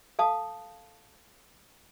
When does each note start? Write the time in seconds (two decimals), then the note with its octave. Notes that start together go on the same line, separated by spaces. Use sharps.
0.19 A4 F5 A5 D#6